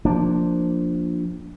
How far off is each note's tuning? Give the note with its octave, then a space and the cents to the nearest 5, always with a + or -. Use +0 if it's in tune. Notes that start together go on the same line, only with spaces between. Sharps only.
F3 +0 A#3 +0 D4 +0